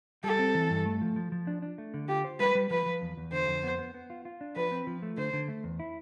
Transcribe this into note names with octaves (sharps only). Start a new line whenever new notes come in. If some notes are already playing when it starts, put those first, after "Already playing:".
G3 A4
C4
E3
G2
A3
F3
F3
F3
D4
D4
A3
D3
F4 G4
C5
G3 B4
G3
F3 B4
F3
E2
E2
D3 C5
F2
B3
B3
B3
F4
F4
D4
F3 B4
C4
F3
A3
D3 C5
D3
A3
E2
E4